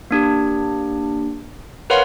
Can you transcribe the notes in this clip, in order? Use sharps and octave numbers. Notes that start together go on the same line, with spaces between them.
A#3 D4 G4
A#4 B4 C#5 F5 F#5 C6